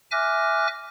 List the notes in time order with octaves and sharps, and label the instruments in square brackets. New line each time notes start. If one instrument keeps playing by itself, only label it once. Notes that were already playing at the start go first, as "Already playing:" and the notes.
[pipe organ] E5 G#5 D6 F6 F#6 A#6